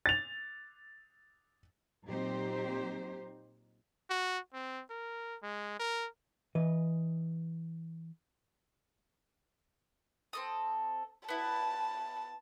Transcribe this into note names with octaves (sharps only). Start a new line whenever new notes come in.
A6 F7
A#2 F#3 C4 D#4 G4 C5
F#4
C4
A#4
G#3
A#4
E3 B4 D#5
C4 A4 D#6
B3 E4 A5